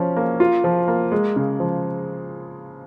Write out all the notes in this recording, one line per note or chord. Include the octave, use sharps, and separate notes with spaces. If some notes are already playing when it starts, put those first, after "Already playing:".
Already playing: F3 C#4
A#3
F4
F3
A#3
G#3
C#3
F3